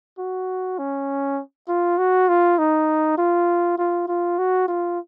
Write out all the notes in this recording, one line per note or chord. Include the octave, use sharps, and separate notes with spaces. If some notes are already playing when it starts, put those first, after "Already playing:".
F#4
C#4
F4
F#4
F4
D#4
F4
F4
F4
F#4
F4